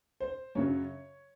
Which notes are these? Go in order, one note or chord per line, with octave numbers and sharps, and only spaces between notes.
C5
F#2 C#3 F#3 C#5